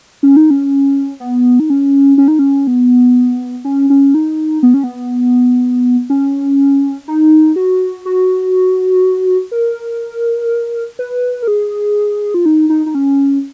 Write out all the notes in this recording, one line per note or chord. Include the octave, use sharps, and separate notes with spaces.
C#4
D#4
C#4
B3
D#4
C#4
C#4
D#4
C#4
B3
C#4
C#4
D#4
B3
C#4
B3
C#4
D#4
F#4
F#4
A#4
B4
A#4
G#4
F4
D#4
D#4
D#4
C#4